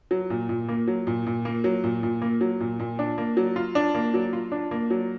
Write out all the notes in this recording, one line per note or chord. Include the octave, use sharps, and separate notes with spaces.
F#3
A#2
A#2
A#3
F#3
A#2
A#2
A#3
F#3
A#2
A#2
A#3
F#3
A#2
A#2
D4
A#3
F#3
F4
D4
A#3
F#3
F4
D4
A#3
F#3